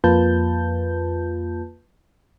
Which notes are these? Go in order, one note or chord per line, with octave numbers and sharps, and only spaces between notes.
F2 A#3 F4 B4 A5 G6